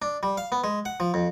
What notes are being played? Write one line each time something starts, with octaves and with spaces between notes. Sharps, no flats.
D4
G3
F5
B3
G#3
F#5
F3
F2